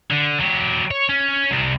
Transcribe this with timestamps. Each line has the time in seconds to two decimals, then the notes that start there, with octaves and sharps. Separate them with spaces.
0.11 D3
0.41 F#3 G4
0.91 C#5
1.09 C#4
1.51 C2 C3